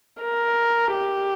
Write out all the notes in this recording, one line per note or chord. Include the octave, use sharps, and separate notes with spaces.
A#4
G4